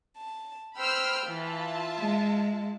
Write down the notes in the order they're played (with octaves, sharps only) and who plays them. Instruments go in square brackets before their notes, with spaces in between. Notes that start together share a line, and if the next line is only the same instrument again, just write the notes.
[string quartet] A5
[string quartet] C5 G5 [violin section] B5 E6 F6
[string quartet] E3 [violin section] F4 E5 A5
[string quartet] G#3